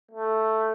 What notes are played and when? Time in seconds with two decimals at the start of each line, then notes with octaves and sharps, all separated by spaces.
0.11 A3